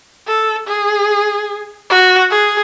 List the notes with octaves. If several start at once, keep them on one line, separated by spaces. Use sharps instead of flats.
A4
G#4
F#4
G#4